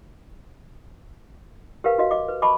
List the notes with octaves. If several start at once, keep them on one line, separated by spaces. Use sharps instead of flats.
G4 A#4 B4 F5
F#4 D#5 F5
D#5 D6
B4
D#5 A5 B5 C#6 D6